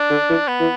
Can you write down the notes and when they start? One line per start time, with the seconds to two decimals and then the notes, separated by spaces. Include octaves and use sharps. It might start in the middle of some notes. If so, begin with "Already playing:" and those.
Already playing: D4
0.10 D3
0.29 E3
0.48 B3
0.60 E3